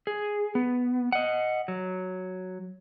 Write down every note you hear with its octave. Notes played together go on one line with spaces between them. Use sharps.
G#4
B3
D#5 F#5
F#3